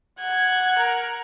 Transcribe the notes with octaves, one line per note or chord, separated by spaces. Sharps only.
F#5 G#6
A#4